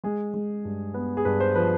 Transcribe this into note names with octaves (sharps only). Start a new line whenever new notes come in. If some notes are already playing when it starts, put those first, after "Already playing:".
G#3 G#4
G#3
G2
B3
G#4
G2 B4
C5
F3 B4